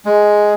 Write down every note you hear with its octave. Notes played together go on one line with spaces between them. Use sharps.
G#3